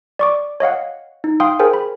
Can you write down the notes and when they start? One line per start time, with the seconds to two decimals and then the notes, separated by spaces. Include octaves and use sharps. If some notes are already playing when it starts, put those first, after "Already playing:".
0.19 D5 C#6 D6
0.60 C#5 D#5 F5 F#5
1.24 D#4
1.40 F5 G5 C6 D#6
1.59 G#4 A#4 C5 G5 G#5
1.73 B5